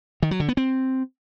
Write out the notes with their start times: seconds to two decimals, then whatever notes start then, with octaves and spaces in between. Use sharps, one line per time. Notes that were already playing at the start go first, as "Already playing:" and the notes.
0.23 D#3
0.31 F#3
0.40 D3
0.49 B3
0.57 C4